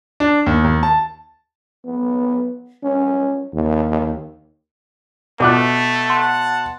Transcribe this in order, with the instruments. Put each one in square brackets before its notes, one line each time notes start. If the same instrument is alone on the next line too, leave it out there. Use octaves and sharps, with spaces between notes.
[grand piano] D4
D#2
D#2
A5
[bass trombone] B3
C#4
D#2
[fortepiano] B2 D6 F#6 [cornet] A3
[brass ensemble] F#5 A5 [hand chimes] C6